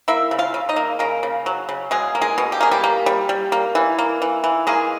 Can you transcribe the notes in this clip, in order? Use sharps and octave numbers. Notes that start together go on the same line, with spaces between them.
A#3 E4 E5
C#3
F4 F5
C#3
D#4 D#5
A#3
C#3 A#3 A#4
C#3
F#3
C#3
B2 G#3 G#4
A#3
G#3 G#4
B2
G4
A#3 G#4
G3 G4
A#3
G3
G3
A#3
E3
A#3
E3
E3
G#3 A#3 G#4